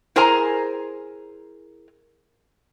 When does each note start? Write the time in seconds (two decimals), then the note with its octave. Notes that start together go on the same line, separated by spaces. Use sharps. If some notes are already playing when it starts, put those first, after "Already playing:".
0.16 E4 G#4 A#4 C5 G#5 A#5